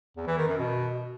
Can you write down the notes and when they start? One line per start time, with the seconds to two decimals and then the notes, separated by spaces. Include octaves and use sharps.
0.17 E2
0.27 E3
0.37 D#3
0.47 F#2
0.58 B2